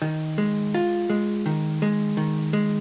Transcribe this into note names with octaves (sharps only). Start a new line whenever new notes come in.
D#3
G#3
F4
G#3
D#3
G#3
D#3
G#3